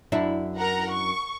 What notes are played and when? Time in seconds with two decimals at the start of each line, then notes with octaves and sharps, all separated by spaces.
0.12 F#2 D4 E4
0.56 A#4 F#5 A#5
0.92 C#6